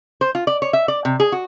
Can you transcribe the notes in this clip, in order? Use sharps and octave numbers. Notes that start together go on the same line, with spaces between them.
C5
F4
D5
C#5
E5
D5
C3
G#4
F#4